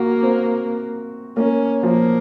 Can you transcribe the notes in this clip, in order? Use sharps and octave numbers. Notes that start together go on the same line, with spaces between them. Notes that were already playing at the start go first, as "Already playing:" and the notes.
Already playing: A#3 F#4
C4
A#3 C#4
F3 A#3